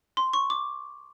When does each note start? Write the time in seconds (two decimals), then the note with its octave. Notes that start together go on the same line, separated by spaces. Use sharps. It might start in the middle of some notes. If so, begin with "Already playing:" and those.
0.17 C6
0.33 C#6
0.50 D6